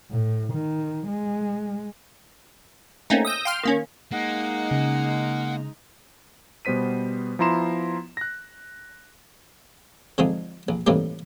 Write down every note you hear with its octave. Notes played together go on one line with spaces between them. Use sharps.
A2
D#3
G#3
A3 A#3 C4 C#4 D#4
D#6 E6 G6 A#6
F5 G5 C6 F6
D#3 A#3 C#4
G#3 A#3 D#4 F#5
C#3
B2 G3 B3 C5 B6 D#7
F3 B3 E4 A#5 C6 E7
F#6 A#6
D3 F3 G#3 C4 D#4
A#1
A2 C3 D#3 E3 G3 A#3